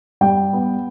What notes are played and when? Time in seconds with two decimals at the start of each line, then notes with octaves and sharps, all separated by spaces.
0.21 G3 G5
0.53 B3